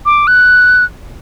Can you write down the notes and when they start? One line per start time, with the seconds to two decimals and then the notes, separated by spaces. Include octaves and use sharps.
0.06 D6
0.27 F#6